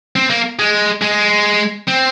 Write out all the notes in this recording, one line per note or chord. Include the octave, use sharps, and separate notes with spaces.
C4
A#3
G#3
G#3
C4